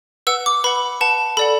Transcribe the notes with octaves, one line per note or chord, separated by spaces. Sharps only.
B4 F#5 E6
D6
B4 F#5 B5
B4 F#5 A5
A4 D5 F#5 B5